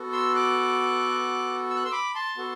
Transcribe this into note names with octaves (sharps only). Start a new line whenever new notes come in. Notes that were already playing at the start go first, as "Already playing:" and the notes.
Already playing: B3 F#4 A4
C6 E6
D6 F#6
E6
F#6
C6 E6
B5 D6
A5 C6
B3 F#4 A4